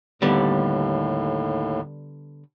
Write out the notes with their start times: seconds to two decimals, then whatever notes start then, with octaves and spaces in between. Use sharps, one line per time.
0.22 D#2 A2 D3 G3 B3